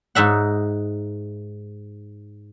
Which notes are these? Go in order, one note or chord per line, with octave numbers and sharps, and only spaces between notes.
G#2 D#4 E5 F#5